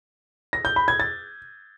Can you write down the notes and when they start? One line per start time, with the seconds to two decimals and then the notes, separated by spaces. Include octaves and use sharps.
0.53 A#6
0.65 G6
0.76 B5
0.88 G#6
1.00 A6